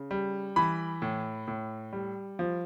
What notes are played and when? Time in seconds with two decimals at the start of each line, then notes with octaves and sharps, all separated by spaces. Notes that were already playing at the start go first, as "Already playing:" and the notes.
Already playing: C#3
0.11 G3
0.56 E3 B5
1.02 A2
1.48 A2
1.93 G3
2.39 F3